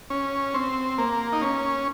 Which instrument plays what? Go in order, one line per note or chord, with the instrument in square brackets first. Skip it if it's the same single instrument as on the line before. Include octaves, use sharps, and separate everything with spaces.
[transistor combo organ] C#4
C4
A#3
D#4
C#4